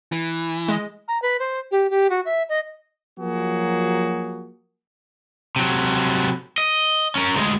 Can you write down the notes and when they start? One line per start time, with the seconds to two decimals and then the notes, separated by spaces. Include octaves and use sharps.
0.12 E3
0.68 G#3 D#5
1.08 A#5
1.22 B4
1.39 C5
1.71 G4
1.90 G4
2.10 F#4
2.25 E5
2.49 D#5
3.18 F3 F#3 A#3 F#4 G#4
5.56 C3 F#3
6.58 D#5
7.15 C#4 A#4
7.36 D2 G#3